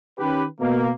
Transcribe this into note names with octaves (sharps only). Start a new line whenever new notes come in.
D#3 C#4 G4 B4
B2 A#3